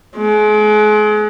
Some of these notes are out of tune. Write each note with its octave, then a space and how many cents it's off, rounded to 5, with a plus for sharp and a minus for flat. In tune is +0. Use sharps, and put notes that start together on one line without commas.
G#3 +35